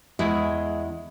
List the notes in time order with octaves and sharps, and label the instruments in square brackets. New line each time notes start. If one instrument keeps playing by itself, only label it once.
[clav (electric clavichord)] E2 E4 [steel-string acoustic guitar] G#3